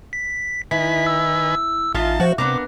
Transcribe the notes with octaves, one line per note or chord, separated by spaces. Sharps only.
B6
D#3 E4 B4 G#5 B6
E6
A1 D#4 F4 E5 A5
F3 F#4 C5
C3 B3 D4 A#4 D6